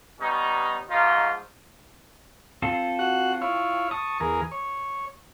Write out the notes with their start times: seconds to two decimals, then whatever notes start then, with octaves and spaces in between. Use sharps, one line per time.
0.20 G3 B3 C#4 D#4
0.89 G#2 F3 A3 D#4 F4
2.62 C4 F4 A4
2.99 F#4 F#5
3.41 E4 F4 C#5
3.91 A5 C#6 D#6
4.20 E2 G#4 A#4
4.52 C#5